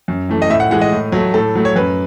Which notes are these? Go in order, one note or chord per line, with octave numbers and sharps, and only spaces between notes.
F#2
E3 A3
D#5
A2 E5
F#5
E3 G#3 F#5
D#5
A2
F#3 A3
A2 A4
F#3 A3
C#5
F#2 B4